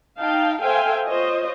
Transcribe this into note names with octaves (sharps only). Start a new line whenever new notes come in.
D#4 F5 G5 A5
A4 C5 E5 F5 G5 G#5
F4 C5 C#5 D#5